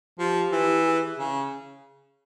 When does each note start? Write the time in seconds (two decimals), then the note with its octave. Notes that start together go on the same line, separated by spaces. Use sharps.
0.19 F3 G4
0.52 E3
0.86 G#4
1.19 C#3